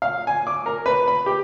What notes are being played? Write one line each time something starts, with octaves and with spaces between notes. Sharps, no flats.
F5
G#5
D6
A#4
B4
B5
G4